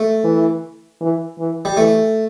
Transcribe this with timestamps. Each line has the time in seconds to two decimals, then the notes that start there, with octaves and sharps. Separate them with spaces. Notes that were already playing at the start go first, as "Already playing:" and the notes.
Already playing: A3
0.24 E3
1.01 E3
1.39 E3
1.65 G3
1.77 E3 A3